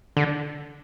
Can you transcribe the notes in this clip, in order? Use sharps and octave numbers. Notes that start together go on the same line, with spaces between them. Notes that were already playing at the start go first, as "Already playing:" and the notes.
D3